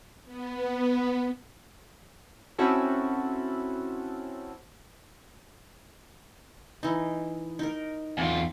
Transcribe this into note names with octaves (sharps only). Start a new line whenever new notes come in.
B3
C4 C#4 E4 F#4 A4
E3 D#4
D#4 A#4
E2 F4